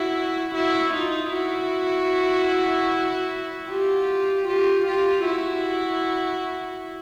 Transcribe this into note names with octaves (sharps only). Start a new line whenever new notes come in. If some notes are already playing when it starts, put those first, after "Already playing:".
Already playing: E4 F#4
E4 F#4
D#4 F4
E4 F#4
F4 G4
F4 G4
F4 G4
E4 F#4